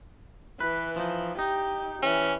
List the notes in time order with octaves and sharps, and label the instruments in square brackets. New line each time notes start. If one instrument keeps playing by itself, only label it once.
[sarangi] E3 [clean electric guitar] B4
[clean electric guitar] F3 D#4
[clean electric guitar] D#4 [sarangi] G4
[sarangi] E3 [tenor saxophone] C#4